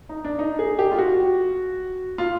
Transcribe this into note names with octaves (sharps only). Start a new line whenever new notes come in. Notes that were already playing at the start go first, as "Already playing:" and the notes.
D#4
D4
D#4
G#4
G4
F4
F#4
F4